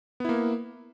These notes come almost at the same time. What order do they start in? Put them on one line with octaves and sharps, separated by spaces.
B3 E4 A#3